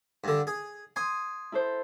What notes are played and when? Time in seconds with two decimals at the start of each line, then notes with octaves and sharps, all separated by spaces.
0.24 G2 D3
0.47 G#4
0.96 G#5 C6 D#6
1.52 E4 A4 C5